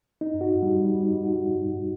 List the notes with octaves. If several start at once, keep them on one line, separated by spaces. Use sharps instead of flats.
D#4
F#4
G3
G3
D#4
F#4